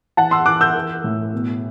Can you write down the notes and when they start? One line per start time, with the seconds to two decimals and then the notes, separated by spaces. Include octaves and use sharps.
0.17 E3 F#5 A5
0.31 C6 E6
0.46 E3 D6 F#6
0.61 E6 G6
0.75 E3
1.04 A2
1.33 B2